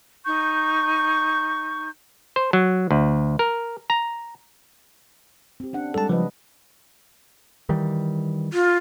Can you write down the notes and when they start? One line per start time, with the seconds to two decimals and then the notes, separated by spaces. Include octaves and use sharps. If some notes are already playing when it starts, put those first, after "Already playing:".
0.25 D#4 C#6 G6
2.36 C5
2.53 F#3
2.91 D2
3.39 A#4
3.90 A#5
5.60 C4 G4
5.73 C#4 D4 F#5
5.94 G3 G#3 A4 D5 A5
6.09 C#3 F3 B4 D#5
7.69 D#3 E3 G3
8.53 F4